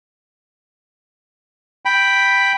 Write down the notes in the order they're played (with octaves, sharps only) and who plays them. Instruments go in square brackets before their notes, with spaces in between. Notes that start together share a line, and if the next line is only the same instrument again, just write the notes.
[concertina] G5 B5